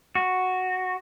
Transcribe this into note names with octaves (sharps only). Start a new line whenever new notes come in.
F#4